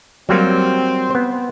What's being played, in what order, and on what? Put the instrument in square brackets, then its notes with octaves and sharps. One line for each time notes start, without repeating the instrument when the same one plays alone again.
[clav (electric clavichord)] F#3 G3 A#3 [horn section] C4
[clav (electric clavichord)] B3 C5